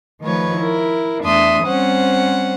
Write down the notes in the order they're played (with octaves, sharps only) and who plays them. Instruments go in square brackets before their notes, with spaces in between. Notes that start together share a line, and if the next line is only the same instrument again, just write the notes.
[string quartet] D#3 F3 A3 B4 C#5
E4 A#4
E2 A3 D4 E5 C6 D#6
G3 C4 C#4 C5 F#5